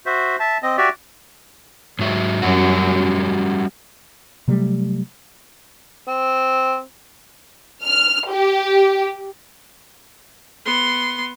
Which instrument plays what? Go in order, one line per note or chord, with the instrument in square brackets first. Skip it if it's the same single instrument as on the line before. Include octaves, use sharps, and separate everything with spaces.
[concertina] F#4 C5 E5
E5 A5
C4 D#5
F#4 G4 D5 E5
[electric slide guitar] G#2 F#3 E5
[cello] F#2 [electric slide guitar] G3 C#4 F#4
[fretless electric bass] C3 F#3 G3 A3
[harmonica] C4
[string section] F6
G4
[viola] B3 C6